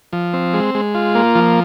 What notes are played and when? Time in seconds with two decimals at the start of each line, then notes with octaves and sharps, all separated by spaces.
0.13 F3
0.34 C4
0.54 G#3
0.75 G#3
0.95 F4
1.15 A#3
1.35 F3